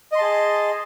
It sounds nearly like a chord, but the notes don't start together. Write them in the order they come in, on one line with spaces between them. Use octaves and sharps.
D#5 C6 A5 G#4